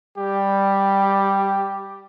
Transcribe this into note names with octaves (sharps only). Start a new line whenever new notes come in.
G3 G4